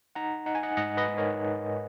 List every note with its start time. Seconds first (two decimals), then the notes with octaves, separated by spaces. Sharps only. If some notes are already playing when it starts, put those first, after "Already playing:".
0.15 D#4 F#5 A#5
0.46 D#4 F#5
0.55 G#5
0.63 D#5 F#5
0.77 G#2 D#5 F#5
0.97 B4 D#5
1.08 G#2
1.18 A#4 C#5